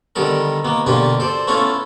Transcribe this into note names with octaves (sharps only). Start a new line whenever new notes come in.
D3 D#3 G3 B3 A4 A#4
D#3 A#3 B3
B2 D3 A#3 D4 F4 G4
A4 C5 D5
A3 B3 C#4 E4 F4 A4